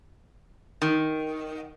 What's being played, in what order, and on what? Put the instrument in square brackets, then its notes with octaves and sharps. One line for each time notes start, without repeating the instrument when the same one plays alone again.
[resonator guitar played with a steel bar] D#3